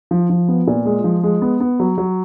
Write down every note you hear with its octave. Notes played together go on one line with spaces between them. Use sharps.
F3
F3
B3
A#2
G#3
F3
G#3
B3
B3
F#3
F#3